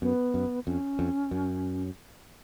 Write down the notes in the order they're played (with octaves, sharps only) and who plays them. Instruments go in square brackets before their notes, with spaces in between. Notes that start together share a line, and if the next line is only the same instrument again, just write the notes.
[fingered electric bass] F#2 [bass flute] B3
[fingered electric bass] F#2
[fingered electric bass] F2 [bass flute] C#4
[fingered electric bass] F2
F#2